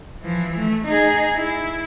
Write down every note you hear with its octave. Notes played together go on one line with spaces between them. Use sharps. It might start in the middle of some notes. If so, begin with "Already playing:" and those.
E3 F3
A3
D#4 G#4
E4